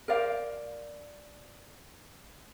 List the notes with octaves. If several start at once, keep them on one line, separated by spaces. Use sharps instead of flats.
A#4 C5 D5 F5